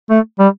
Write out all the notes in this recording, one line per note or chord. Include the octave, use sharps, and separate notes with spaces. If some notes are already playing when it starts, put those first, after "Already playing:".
A3
G3